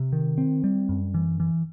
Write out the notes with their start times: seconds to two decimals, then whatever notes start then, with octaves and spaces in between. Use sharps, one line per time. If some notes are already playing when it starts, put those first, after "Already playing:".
Already playing: C3
0.12 D#3
0.38 C4
0.64 G3
0.89 F#2
1.14 E3
1.40 E3